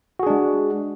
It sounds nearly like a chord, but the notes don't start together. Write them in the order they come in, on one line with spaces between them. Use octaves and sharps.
F#4 G#4 D4 G#3